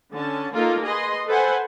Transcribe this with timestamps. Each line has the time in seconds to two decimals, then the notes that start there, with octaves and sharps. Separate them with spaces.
0.14 D3 C#4 A5
0.54 A#3 D#4 F4 A4 A#4
0.84 G#4 B4 D#5 C6
1.27 A4 B4 C5 F#5 G#5